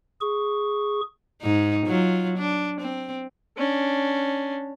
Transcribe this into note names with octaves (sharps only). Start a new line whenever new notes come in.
G#4 C#6
G#2 D#4
F#3 F4
D4
C4
C#4 D4